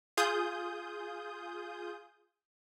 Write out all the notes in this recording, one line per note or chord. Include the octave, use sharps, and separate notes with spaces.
F4 G#4 D#6 G6